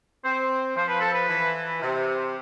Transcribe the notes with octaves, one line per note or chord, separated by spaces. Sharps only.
C4 C5
F3 C5
B4
A4
B4
E3
C3